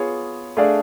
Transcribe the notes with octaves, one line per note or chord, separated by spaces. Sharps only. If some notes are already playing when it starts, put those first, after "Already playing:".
Already playing: B3 F4 G#4 C#5
A3 D4 G#4 D5 F5